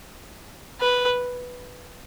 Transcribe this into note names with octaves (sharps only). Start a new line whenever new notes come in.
B4